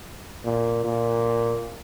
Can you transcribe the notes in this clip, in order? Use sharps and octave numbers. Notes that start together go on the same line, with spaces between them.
A#2
A#2